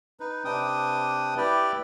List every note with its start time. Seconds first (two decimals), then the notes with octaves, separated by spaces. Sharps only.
0.20 D#4 B4
0.45 C3 D4 B4 G5 D#6
1.37 E4 G4 B4 D5 G5